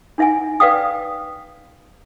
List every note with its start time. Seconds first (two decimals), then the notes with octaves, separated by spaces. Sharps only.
0.18 D4 D#4 E5 F#5 G#5
0.60 B4 D5 F5 G5 D#6